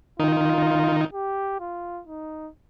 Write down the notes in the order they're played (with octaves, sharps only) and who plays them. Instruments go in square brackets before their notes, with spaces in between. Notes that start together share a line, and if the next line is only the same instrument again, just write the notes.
[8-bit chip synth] D#3 D#4 [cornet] F4
[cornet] G4
F4
D#4